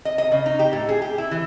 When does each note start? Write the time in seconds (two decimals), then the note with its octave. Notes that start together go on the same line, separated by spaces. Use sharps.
0.05 D#5
0.18 D#5
0.32 C#3
0.46 D#4
0.59 G4
0.73 A2
0.89 G#4
1.02 G4
1.18 E4
1.31 E3